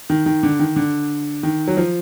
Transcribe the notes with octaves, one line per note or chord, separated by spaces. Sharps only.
D#3
D#3
D3
D#3
D3
D#3
F#3
F3